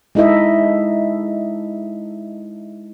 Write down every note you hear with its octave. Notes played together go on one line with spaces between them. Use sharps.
G#3 D#4 E4 A4 D#5 E5